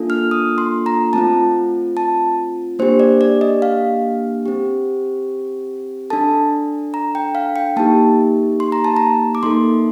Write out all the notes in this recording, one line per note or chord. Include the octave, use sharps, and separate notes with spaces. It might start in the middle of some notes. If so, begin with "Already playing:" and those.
Already playing: A#3 D4 F4 A4
F6
D#6
C6
A#5
A3 C4 F4 A5
A5
A#3 D4 G4 C5
D5
D5
D#5
F5
C4 G4
D4 A4 A5
A#5
G5
F5
G5
A#3 D#4 G4 A5
C6
A#5
A5
A#5
D6
A#3 D#4 A4 C6